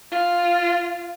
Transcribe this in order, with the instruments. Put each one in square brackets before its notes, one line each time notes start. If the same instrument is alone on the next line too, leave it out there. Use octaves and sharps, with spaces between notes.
[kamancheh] F4